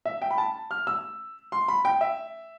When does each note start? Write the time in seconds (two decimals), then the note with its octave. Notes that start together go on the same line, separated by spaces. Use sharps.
0.05 E5
0.22 G5
0.31 B5
0.38 A5
0.71 F6
0.87 E6
1.52 C6
1.68 B5
1.85 G5
2.01 E5